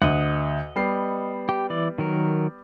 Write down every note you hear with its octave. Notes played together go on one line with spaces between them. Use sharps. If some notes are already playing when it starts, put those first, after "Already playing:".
D2 D#5 F#5
G3 B3 C7
G4
E3 D5
D#3 F#3 A#4